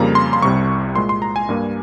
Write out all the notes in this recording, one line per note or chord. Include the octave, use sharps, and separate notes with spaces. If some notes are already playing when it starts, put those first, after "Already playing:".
Already playing: F2 C#3 G3 A#3 A#5
C6
C6
C2 C3 G3 C#6
A#2 G#3 C6
C6
A#5
G#5
G2 G3 A#3